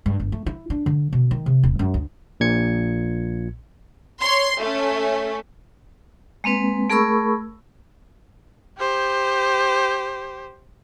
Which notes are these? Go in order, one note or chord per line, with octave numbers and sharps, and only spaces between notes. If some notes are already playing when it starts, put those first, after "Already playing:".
G2
G1
A3
E4
D4
D3
B2
D#3
C3
D#1
F#2
D2
A#1 A#2 G#6 C#7
C#5 C6
A3 C#4
G#3 A#3 C4 B4
A3 G#4 A#4 B5 C#6 E6
G4 C5